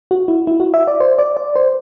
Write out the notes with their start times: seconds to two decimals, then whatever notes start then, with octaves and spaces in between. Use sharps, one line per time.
0.11 F#4
0.28 E4
0.47 E4
0.60 F#4
0.74 E5
0.87 D5
1.00 C5
1.18 D5
1.37 D5
1.56 C5